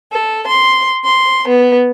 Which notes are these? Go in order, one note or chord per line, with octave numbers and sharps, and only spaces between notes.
A4
C6
C6
B3